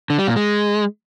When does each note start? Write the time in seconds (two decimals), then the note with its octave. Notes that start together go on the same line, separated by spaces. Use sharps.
0.10 D3
0.19 G3
0.27 A#2
0.36 G#3